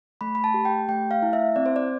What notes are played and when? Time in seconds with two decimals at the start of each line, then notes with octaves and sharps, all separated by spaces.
0.21 A3 B5
0.35 B5
0.44 A5
0.54 G4
0.65 G5
0.88 A3 G5
1.11 F5
1.22 E4
1.33 E5
1.56 C4 D5
1.66 C5
1.76 D5